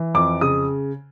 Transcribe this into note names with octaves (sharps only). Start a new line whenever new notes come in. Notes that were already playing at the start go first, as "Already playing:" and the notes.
Already playing: E3
F2 D6
C#3 D#6